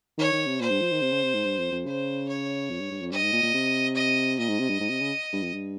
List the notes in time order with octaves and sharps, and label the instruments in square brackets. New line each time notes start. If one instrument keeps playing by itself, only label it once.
[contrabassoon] D#3 [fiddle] C#5
[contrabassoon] D#3
C3
[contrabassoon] A#2 [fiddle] C5
[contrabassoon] G2
F3
D#3
C3
C#3
C3
G#2
G2
F2
F2
[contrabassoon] C#3 [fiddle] C5
[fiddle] C#5
[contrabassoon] F2
G2
G2
F2
[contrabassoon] G2 [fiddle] D#5
[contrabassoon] G#2
A#2
A#2
C3
[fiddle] D#5
[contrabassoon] A#2 [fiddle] D#5
[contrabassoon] G#2
C3
G2
G#2
C3
C#3
G2
F2
G2